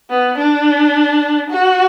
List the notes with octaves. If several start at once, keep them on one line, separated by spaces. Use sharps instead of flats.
B3
D4
F#4